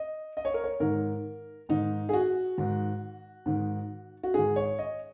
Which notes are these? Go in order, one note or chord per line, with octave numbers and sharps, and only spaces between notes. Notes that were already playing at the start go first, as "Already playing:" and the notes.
Already playing: D#5
D#5
C#5
A#4
C#5
G#2 D#3 A#4
G#2 D#3 D#4
G#4
F#4
G#2 D#3
G#2 D#3
F#4
G#2 D#3 G#4
C#5
D#5